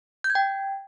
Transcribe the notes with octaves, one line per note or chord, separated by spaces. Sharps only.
G6
G#6
G5